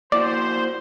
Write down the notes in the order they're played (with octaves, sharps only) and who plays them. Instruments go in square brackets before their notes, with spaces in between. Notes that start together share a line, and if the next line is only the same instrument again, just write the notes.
[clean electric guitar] A#3 E4 F#4 [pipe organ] C5 [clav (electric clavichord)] D5